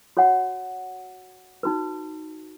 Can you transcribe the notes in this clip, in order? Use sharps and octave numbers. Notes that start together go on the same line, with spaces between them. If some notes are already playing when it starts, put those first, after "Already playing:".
F#4 C#5 F#5
D#4 F#4 B4